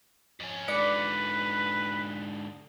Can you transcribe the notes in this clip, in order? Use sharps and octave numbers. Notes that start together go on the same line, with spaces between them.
F2 C#4
G#2 D3 B4 D5 D6 C#7